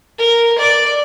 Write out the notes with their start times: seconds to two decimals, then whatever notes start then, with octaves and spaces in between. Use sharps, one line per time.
0.18 A#4
0.59 D5